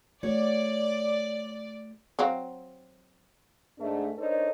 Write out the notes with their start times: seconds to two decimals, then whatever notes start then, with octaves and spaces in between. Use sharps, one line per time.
0.23 A3 F#4 C#5 D5
2.19 F#3 C4 F5
3.78 G#2 A3 D4
4.18 D4 D#4 A4 A#4 C5 C#5